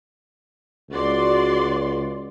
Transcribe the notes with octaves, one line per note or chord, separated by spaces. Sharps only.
C#2 F#4 D5 C6